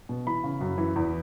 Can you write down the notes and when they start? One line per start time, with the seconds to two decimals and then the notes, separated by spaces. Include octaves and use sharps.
0.09 B2
0.27 E3 B5
0.44 C#3
0.61 F#2
0.78 E3
0.96 E2